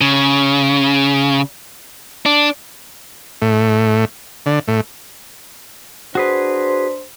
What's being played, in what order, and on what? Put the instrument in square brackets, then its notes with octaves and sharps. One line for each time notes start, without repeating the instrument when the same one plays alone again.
[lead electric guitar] C#3
D4
[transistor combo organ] A2
D3
A2
[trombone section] D4 C5 [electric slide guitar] F#4 G#4 B4